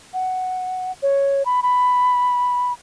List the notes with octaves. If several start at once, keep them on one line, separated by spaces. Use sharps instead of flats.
F#5
C#5
B5
B5